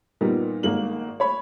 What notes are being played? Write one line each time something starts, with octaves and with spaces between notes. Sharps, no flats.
A#2 G3 B3 D#4 A#4
G#1 G#2 A#3 F#7
C#5 B5